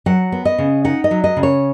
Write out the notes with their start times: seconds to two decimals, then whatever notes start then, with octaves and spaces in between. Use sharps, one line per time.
0.06 F#3 F#5
0.32 B3
0.45 D#5
0.58 C#3
0.84 D#4 F#5
1.04 D#5
1.11 F#3
1.24 D#5
1.37 C#3
1.43 C#5